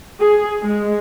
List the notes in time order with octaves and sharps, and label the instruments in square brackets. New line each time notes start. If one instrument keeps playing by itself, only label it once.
[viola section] G#4
G#3